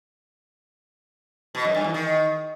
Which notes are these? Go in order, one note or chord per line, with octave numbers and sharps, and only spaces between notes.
B2
F#2
G2
E2
D#3